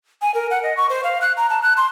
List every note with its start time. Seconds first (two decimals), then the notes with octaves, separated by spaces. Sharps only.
0.22 G#5
0.34 A#4
0.51 F#5
0.63 D#5
0.77 C#6
0.89 C5
1.04 F5
1.21 F#6
1.37 A#5
1.50 A5
1.62 F#6
1.77 C6